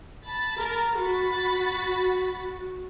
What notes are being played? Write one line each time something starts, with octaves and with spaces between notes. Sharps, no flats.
A5 B5 A6
A#4
F#4 B5 A6